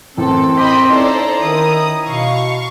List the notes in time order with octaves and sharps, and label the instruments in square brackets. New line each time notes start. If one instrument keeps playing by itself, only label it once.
[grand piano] F#2 A2 E3 [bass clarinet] C4 [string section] A4
[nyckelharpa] C5 [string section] D#5 G5 B5 [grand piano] C6 D6 B6
[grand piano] C#4 D#4 D#5 [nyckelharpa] E4 A#5 [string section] A4 C5 D5
[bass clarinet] D#3 [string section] D#6
[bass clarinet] B2 [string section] F5 C#6